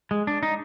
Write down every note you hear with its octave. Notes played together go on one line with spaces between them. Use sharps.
G#3
D4
D#4